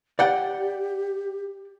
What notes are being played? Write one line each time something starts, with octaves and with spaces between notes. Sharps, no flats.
G4 D5 F#5 G5